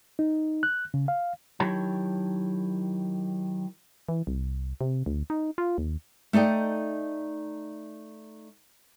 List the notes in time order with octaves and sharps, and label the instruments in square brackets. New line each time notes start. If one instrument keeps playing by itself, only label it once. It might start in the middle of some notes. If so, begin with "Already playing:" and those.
[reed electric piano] D#4
F#6
C#3
F5
[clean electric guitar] D#3 F#3 E4 G4 C#5 A5
[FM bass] E3
C2
C3
D2
D#4
F4
D#2
[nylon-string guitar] A3 D#4 D5 D#5 G5